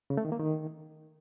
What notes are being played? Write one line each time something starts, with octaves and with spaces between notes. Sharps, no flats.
C#3
A3
D#3
A#3
D#3